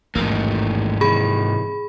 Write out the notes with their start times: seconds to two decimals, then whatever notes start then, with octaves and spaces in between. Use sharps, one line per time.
0.15 A1 E2 G#2 A#3
1.01 C3 E3 G#4 B5